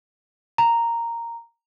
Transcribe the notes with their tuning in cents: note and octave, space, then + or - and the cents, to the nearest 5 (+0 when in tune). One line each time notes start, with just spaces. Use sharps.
A#5 -5